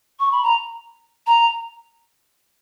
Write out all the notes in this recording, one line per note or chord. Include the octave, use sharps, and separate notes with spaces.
C#6
B5
A#5
A#5